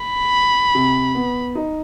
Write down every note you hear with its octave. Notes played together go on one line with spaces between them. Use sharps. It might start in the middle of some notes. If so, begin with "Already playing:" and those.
Already playing: B5
C3
B3
D#4